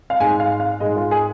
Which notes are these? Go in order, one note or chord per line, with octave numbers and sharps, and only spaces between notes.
F5
G#2 G#3 G#5
F5
F5
G#2 G#3 D#5
F4
G#4